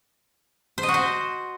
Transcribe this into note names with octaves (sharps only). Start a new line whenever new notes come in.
C5
D#5
F#4
C5